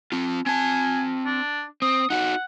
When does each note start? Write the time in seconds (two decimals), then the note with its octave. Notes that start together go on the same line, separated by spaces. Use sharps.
0.12 C4 F4
0.46 C4 G#5 A5
1.26 D4
1.82 C4 D#6
2.10 D#4 F#4 F#5